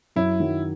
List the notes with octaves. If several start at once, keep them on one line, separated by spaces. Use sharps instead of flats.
F#2 E4
D#3 F#3